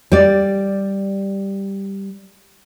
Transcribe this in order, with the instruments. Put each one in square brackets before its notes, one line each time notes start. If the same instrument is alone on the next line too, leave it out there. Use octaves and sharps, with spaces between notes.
[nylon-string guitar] G3 D5